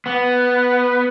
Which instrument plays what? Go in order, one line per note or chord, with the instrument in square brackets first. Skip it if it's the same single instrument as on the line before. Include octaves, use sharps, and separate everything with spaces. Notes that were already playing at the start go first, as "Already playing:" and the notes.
[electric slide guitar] B3